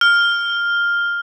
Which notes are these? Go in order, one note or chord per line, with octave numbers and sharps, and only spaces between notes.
F6